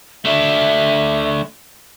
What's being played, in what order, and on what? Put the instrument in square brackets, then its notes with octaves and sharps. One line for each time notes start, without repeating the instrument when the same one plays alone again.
[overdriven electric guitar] A3 D4 [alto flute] E5